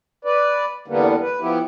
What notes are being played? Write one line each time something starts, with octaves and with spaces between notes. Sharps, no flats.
B4 D5
E2 D3 G3 A#3 B3
B4
F3 B3 E4 G4